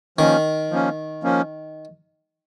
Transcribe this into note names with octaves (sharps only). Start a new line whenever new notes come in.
D#3 F3 A#3 C#4
F3 A#3 C#4
F3 A#3 C#4